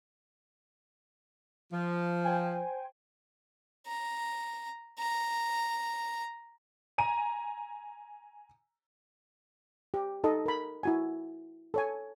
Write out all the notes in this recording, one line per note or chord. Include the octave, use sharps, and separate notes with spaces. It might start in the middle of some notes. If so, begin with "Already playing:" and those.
F3
C5 G5 G#5
A#5
A#5
G#5 A#5 D#7
G4
D#4 A4 D#5
A#4 B5
E4 F#4 G#5
A4 C#5 G#5